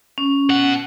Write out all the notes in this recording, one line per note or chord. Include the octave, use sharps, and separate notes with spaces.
C#4
B2 F#5